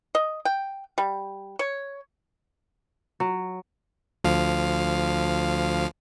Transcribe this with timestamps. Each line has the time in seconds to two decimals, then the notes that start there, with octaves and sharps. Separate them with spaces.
0.15 D#5
0.45 G5
0.98 G3
1.59 C#5
3.20 F#3
4.24 D2 F3 F5